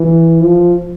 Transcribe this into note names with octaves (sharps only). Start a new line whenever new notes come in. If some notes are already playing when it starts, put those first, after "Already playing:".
Already playing: E3
F3